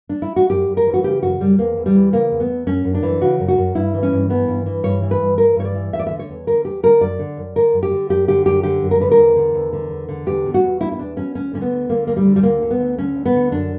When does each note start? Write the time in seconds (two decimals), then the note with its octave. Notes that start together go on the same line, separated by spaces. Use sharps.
0.09 D4
0.22 E4
0.36 F#4
0.50 F#2 G4
0.68 F#2
0.77 A#4
0.87 E3
0.94 F#4
1.04 C#3 G4
1.22 F#2 F#4
1.40 F#2 G3
1.59 E2 A#3
1.77 E2
1.86 G3
1.95 E3
2.13 C#3 A#3
2.31 E2
2.40 B3
2.49 E2
2.67 F#2 C#4
2.85 F#2
2.94 D4
3.03 E3
3.21 C#3 F#4
3.40 F#2
3.48 F#4
3.57 F#2
3.75 G2 E4
3.94 E3
4.03 C#4
4.12 G2
4.30 E3 B3
4.47 G2
4.66 E3
4.83 G2 C#5
5.02 E3
5.11 B4
5.20 G2
5.38 E3 A#4
5.56 G2 C#5
5.65 D5
5.74 E3
5.93 E2 E5
5.99 D5
6.07 D3 E5
6.19 C#5
6.29 E2
6.47 D3 A#4
6.65 E2 G4
6.83 D3 A#4
7.01 F#2 D5
7.19 D3
7.37 F#2
7.56 D3 A#4
7.73 F#2
7.83 G4
7.91 D3
8.09 F#2 G4
8.28 D3 G4
8.46 F#2 G4
8.63 D3 G4
8.82 F#2
8.91 A#4
9.00 D3 B4
9.11 A#4
9.18 E2
9.36 D3
9.54 E2
9.73 D3
9.91 E2
10.09 D3
10.26 E2 G4
10.45 B2
10.54 F#4
10.63 E2
10.80 B2 E4
10.92 E4
10.99 E2 D4
11.17 B2 C#4
11.35 D2 C#4
11.53 D3 C#4
11.62 B3
11.71 D2
11.89 D3 A#3
12.07 D2 A#3
12.17 G3
12.25 D3
12.36 G3
12.43 D2 A#3
12.62 D3
12.71 B3
12.80 D2
12.98 D3 C#4
13.16 D2
13.26 B3
13.34 D3
13.52 F#2 D4